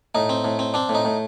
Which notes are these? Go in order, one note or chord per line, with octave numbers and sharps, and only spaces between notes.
A2 D#4
C4
A2
C4
C4 D4
A2
D#4
A2